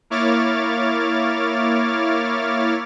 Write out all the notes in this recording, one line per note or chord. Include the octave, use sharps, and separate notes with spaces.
A#3 E4 C#5 D6 F6 A6